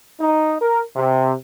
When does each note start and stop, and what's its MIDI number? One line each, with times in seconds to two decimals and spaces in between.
0.21 0.57 63
0.61 0.82 70
0.96 1.34 48